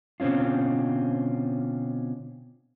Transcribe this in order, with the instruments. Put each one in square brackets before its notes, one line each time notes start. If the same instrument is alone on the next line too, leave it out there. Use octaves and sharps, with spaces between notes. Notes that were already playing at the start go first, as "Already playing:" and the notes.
[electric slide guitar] B2 D3 C4 C#4 F4